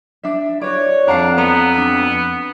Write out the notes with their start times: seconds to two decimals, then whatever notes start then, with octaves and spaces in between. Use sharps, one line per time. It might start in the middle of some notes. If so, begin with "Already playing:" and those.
0.23 D4 E5
0.61 F#4 B4 C#5 D5
1.08 F2 D4 F5 F#5 A#5
1.38 B3 A#5
1.77 D4